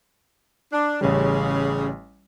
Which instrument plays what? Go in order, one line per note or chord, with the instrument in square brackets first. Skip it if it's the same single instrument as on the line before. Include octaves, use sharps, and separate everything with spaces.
[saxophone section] D4
[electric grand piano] A1 G3 [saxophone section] C#3